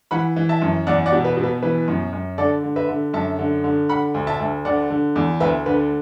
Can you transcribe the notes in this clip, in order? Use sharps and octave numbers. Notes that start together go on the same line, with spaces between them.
E3 F#5 B5
E3
E5 A5
F#2
E2 D5 F#5
D5 F#5
B2
B4
B2
B4
E3 B4
F#2
F#2
D3 A4 D5
D3
B4 E5
D3
F#2 E5 A5
D3
D3
D3 F#5 B5
D2
E5 A5
D2
D3 D5 F#5
D3
E2
D2 B4 E5
D3 B4